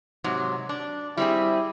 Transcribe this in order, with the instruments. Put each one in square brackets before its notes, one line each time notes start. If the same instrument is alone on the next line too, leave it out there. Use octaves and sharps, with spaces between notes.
[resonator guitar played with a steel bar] G#2 C3 F#3
D4
[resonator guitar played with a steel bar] G3 C4 G#4 [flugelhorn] E4